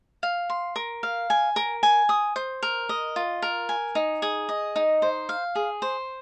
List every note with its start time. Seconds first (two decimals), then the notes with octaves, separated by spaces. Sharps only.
0.23 F5
0.50 C6
0.76 A#4
1.03 F5
1.30 G#5
1.56 A#4
1.83 G#5
2.09 D#6
2.36 C5
2.63 A#4
2.89 D#5
3.16 F4
3.42 A#4
3.69 G#5
3.95 D#4
4.22 G#4
4.49 D#5
4.76 D#4
5.02 C5
5.29 F5
5.55 G#4
5.82 C5